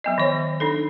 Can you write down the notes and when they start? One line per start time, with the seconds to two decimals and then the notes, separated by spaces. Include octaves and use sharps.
0.04 F#3 B3 D#5
0.18 D#3 F3 C#5
0.60 D4 D#4 A4